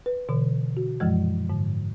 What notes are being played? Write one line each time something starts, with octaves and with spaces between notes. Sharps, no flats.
B4
B2 D3 E3
F#4
F#2 A#2 E3 F3 G#3
G#2 D3